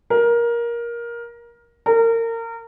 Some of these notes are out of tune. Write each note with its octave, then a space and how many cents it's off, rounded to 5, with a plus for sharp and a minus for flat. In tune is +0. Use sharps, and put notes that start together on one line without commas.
A#4 +15
A#4 -30